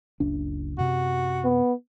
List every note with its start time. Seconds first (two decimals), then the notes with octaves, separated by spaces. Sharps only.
0.20 F#1 C#2 D4
0.78 F#2 C3 F#4
1.44 B3